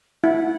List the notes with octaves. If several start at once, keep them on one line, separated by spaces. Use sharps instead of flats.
E4 F#5